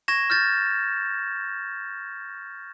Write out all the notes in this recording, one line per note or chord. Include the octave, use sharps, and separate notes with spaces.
C#6 G#6 A#6 E7
F6 G6 A6